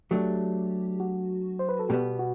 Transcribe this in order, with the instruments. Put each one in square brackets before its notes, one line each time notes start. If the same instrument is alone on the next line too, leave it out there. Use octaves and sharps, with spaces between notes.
[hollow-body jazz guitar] F#3 A3 D4 [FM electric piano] G4
[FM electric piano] F#4
C5
B4
A4
[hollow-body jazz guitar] B2 G3 B3 [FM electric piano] G4
[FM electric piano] F#4